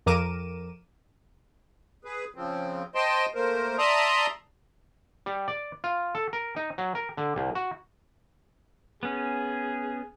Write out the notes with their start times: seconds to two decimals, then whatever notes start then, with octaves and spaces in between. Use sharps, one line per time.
0.06 F2 A#4 D6 D#7 E7
2.04 G#4 B4
2.35 C#3 F3 C4
2.95 C5 D#5 G5 A5 C6
3.34 A3 A#3 A#4 C5
3.78 D5 E5 A5 A#5 C6 D#6
5.26 G3
5.48 D5
5.84 F4
6.15 A4
6.33 A#4
6.56 D#4
6.78 F#3
6.95 A#4
7.17 D3
7.36 C2
7.55 F#4
9.03 B3 C#4 G#4